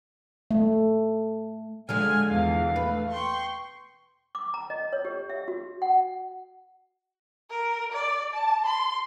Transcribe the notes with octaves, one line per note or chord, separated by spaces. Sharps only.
A3
D3 F3 G#3 G#5 F6
E2 B2 E3 F5
A3 B4
G5 C6 C#6
D6
A#5
D#5
C#5
G4
E5
F#4
F#5
A#4
D5
A5
C6